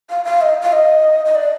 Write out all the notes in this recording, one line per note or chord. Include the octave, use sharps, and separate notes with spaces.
F5
F5
D#5
F5
D#5
D#5
D5